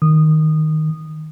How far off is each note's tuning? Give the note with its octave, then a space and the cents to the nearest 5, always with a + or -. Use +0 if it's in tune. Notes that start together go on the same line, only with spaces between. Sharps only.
D#3 +0 D#6 -15